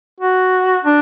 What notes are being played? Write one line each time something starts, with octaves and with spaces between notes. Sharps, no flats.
F#4
D4